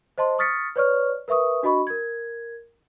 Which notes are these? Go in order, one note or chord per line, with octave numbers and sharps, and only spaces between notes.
C5 D#5 A5 C6
C#6 D#6 F6 A6 B6 C#7
B4 C#5 D5 C#6 F6
A#4 B4 E5 C#6 D#6
D4 F#4 D#5 B5 C#6
A#4 G#6